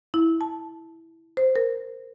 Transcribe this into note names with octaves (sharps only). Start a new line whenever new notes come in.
E4
A5
C5
A#4